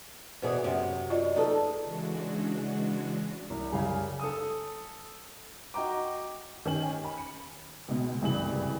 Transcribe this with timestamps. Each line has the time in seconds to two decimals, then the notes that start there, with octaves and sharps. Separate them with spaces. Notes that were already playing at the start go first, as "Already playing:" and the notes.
0.42 E2 B2 G#4 C5
0.64 F#2 C3
1.10 F4 D5 D#5
1.36 D#4 G#4 A4 B4 D5
1.83 C#3 E3 G#3 D4 F#4
3.50 C2
3.72 F#2 C#3 G3 G#4 F5 G#5
4.20 A4 D#6
5.74 F#4 D#5 G5 A#5 D6
6.66 D#3 C#4 G4 G#5 F#7
7.05 B5
7.18 C#7
7.88 C#2 B2
8.21 F#1 C2 G2 E3 G#3 F#7